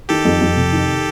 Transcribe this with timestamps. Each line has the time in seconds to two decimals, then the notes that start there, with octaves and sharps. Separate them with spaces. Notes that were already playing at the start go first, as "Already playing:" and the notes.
0.09 D#3 G4 A4
0.25 F2
0.41 F2
0.56 C3
0.73 D#3